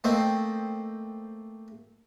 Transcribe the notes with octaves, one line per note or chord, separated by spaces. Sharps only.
A3 A#3 C4 C5 D#5